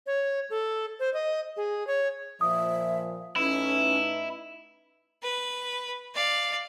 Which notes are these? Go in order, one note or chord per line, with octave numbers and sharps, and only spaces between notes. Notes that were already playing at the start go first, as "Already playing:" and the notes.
C#5
A4
C5
D#5
G#4
C#5
A#2 F3 E5 D#6
A2 C#4 D#4 E4 B4
B4
D5 F5